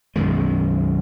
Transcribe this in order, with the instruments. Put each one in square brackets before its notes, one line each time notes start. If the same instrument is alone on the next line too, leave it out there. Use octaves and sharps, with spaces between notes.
[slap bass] B1 F#2 D#3 G#3